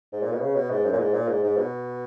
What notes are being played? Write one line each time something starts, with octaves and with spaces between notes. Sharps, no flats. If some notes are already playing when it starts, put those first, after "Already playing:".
G#2
A#2
B2
C#3
B2
G#2
F#2
A#2
G#2
A#2
G#2
G#2
B2